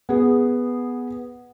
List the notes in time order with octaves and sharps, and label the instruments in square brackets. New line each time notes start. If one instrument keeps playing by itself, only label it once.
[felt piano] B3 G#4